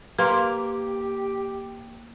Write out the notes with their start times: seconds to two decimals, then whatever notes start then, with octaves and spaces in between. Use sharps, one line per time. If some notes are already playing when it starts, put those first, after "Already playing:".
0.19 A#3 G4 B4 C6